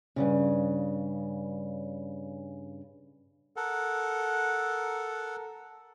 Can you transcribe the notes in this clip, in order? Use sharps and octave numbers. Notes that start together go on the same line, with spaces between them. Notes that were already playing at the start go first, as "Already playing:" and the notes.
G2 A#2 C#3
A4 A#4 F#5